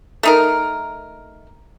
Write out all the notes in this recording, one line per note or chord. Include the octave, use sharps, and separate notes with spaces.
A3 D#4 A#4